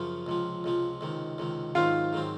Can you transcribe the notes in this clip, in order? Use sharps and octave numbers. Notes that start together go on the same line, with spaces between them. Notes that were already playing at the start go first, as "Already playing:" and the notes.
Already playing: F#2 C#3 F3
C#2 C3 F3
C#2 C3 F3
C#2 C3 D#3
C#2 C3 D#3
G#2 D#3 F#3 C4 F4
G#2 D#3 F#3 C4